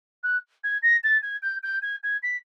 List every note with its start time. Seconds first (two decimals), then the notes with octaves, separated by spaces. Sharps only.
0.23 F#6
0.64 G#6
0.82 A#6
1.04 A6
1.23 G#6
1.42 G6
1.63 G6
1.82 G#6
2.03 G#6
2.23 B6